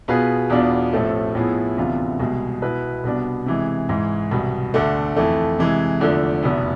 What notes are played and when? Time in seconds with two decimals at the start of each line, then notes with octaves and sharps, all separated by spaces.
0.08 B2 B3 F4 G#4 B4
0.50 E2 B2 B3 D4 F4
0.93 A1 A2 F3 A3 C4
1.35 A2 F3 B3 E4 G#4
1.77 D2 C3 E3 B3 F4
2.20 C2 B2 G#3
2.62 B2 B3 E4 B4
3.04 C2 B2 B3 D4
3.46 C3 E3 G#3
3.89 G#2 E3 G#3
4.31 C2 B2 B3
4.74 D2 D3 A3
5.16 F2 E3 A3
5.59 C3 E3 G#3
6.00 E2 D3 F3 A3
6.43 F1 E2 B2 B3